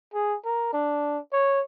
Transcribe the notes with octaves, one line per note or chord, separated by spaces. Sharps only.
G#4
A#4
D4
C#5